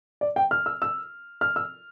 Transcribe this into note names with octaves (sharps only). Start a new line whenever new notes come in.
D5
G5
F6
E6
E6
F6
E6